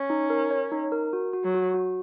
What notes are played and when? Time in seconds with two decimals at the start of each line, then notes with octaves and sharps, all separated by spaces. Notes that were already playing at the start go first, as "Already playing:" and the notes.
Already playing: C#4
0.10 D#4
0.30 A#4
0.51 C#5
0.72 D#4
0.92 A#4
1.13 F#4
1.33 F#4
1.44 F#3
1.54 F#4
1.74 F#4